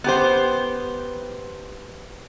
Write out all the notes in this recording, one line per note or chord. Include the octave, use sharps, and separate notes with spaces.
B3 G4 C5